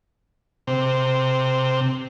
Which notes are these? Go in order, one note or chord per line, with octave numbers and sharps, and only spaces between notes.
C3